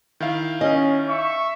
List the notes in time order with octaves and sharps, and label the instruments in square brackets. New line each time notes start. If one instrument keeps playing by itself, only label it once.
[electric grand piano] D#3 E4 F5
[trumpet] C#4 [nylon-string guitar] D#5
[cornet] E5 [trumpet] C#6